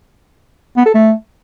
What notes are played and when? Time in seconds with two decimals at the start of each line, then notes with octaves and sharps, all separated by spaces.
0.77 B3
0.86 A4
0.94 A3